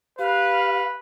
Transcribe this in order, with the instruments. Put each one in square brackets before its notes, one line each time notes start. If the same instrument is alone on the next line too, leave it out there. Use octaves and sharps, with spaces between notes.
[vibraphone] G4 [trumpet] B4 [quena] F5